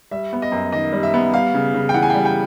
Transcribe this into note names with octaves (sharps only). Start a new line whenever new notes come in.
G3 E5
B3
D#5
F#2
D#3 D#5
G3
E5
B3
G3 F5
C#3
C#3
G5
E3 F#5
G#5
G3 G5
G5